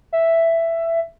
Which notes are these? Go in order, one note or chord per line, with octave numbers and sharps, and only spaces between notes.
E5